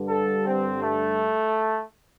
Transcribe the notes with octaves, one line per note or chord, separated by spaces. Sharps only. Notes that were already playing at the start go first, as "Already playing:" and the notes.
Already playing: G2 D3
A4
C4
A3